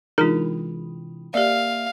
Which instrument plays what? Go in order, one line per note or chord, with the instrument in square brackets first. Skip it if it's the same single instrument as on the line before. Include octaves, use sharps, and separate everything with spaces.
[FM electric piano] C3 E3 G#3 [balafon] D4 F4 G#4 [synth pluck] D#4 A#4
[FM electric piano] A#3 E5 [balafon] G4 D5 [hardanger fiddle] F5